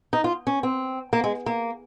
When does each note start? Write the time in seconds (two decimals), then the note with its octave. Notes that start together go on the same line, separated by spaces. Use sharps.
0.13 D#4
0.24 F4
0.47 C#4
0.63 C4
1.13 A#3
1.24 G#3
1.46 A#3